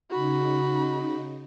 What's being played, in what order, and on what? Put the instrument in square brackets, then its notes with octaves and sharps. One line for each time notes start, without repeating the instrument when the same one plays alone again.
[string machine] C#3 D#4 [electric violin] F#4 B5